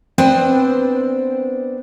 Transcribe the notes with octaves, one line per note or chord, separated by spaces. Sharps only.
B3 C4 D4 B4 C5